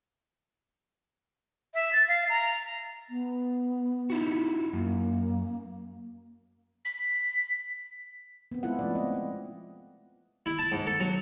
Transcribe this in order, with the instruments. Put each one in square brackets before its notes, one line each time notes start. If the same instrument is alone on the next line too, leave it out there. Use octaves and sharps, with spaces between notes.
[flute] E5
A6
F5
A#5
[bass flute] B3
[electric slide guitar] D#4 E4 F#4
[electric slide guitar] F#2 [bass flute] A#3
[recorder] B6
[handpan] B3 C4
G#3 B3 E4 F4 A4 F#5
F3 A3 C#4 D5
B3 C4 D#5
F4
[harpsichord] E4
A5
G#2
A4
F#3